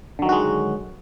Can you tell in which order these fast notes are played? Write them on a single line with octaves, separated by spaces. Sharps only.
D3 F#3 D#3 F#4 G#3